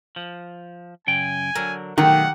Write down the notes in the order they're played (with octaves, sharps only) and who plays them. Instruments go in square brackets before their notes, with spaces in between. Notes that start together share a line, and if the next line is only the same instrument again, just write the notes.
[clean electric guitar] F3
[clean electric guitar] F#2 C#3 G5 [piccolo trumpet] G#5
[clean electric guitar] D3 F#3 [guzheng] A#4
[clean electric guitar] B1 F#3 A3 [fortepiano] D#3 [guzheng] G4 [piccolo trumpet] F#5